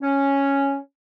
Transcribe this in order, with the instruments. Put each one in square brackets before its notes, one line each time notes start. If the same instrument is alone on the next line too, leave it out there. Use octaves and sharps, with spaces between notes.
[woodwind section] C#4